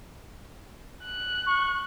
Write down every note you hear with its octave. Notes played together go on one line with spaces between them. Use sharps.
F#6
C#6